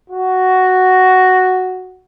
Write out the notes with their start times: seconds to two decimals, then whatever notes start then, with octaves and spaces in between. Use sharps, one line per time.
0.10 F#4